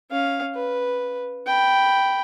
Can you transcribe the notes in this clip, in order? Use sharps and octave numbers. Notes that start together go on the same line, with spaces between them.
C#4 F5
B4
G5 B5